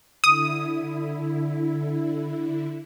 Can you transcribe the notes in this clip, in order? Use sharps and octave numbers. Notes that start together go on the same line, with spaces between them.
D3 E4 D#6